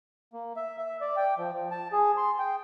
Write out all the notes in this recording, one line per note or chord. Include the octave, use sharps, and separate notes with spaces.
A#3
E5
E5
D5
G5
F3
F3
A5
G#4
C6
G5